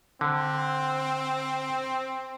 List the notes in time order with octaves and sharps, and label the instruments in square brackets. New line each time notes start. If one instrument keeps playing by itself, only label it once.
[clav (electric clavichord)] D3 [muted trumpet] C4